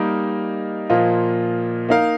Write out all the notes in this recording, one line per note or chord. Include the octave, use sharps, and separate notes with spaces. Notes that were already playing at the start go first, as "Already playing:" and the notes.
Already playing: G3 A#3 D#4 A#4
A#2 F3 A#3 F4 D#5
A#3 D#4 A#4 F5